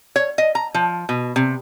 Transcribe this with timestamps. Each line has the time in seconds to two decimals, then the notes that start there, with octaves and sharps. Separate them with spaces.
0.16 C#5
0.38 D#5
0.55 A#5
0.75 F3
1.09 B2
1.36 C3